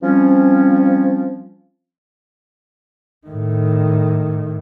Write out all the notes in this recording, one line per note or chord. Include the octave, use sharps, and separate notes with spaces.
F3 G3 C4 C#4
A2 D#3